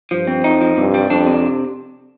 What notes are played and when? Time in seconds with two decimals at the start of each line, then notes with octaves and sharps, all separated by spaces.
0.11 G2 F3
0.27 C4
0.44 F2 D#4
0.61 F3
0.77 G2 C3
0.94 G3
1.10 F2 D4
1.27 C3